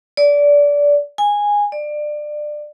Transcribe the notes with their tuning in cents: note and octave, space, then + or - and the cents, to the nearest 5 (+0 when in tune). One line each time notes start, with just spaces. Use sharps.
D5 -20
G#5 -10
D5 +25